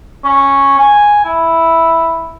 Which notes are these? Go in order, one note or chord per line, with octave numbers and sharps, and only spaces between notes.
C#4
G#5
E4